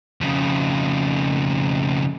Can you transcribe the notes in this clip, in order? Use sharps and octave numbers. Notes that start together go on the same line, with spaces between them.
F2 C#3